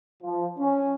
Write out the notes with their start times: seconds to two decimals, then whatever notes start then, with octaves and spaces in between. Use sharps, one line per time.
0.22 F3
0.59 C#4